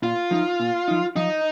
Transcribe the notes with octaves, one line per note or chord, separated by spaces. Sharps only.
A#2 F4
F3 D#4
A#2
F3 D#4
F3 D#4